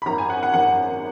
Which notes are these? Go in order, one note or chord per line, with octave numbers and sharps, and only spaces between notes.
B5
G#1 F#2 D#3 A#5
G#5
F#5
F#5
G#1 F#2 D#3 F#5